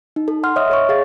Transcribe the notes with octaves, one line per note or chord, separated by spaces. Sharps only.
D#4
A4
F#5 C6 F6
C#5 D#5 E5 D#6 F6
A4 C#5 C#6
G#4 F5 A6